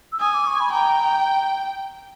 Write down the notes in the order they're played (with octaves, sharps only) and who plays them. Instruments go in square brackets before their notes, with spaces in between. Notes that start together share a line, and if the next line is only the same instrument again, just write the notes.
[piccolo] E6
[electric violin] G#5 [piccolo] D#6
[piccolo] D6
C#6
B5
[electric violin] G5 [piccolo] A#5